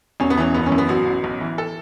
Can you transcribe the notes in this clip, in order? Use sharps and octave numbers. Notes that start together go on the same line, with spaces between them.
E1 C#4
B3
E3 C#4
F#1 B3
C#4
F#2
B3
A1 F#4
A1
B1
E3
A4